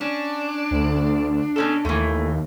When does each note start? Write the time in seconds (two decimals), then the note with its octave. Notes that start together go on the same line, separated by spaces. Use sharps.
0.01 C#4 D4
0.71 D2
1.56 B2 C#4 A4
1.85 D#2 E3 A3